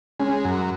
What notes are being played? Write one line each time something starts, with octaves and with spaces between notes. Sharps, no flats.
G#3 C#4
F#2